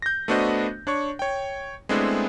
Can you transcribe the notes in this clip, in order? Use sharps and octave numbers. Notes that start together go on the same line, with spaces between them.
G6 A#6
A3 B3 D4 F#4 C5 D#5
D4 C#5 C#6
C#5 G5
G#3 A3 B3 C4 D4 E4